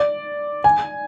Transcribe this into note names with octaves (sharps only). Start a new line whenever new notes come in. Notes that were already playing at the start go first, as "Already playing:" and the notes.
Already playing: D5
G#5